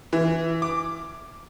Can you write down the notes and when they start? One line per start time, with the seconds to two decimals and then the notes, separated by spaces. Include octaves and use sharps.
0.13 E3
0.62 D6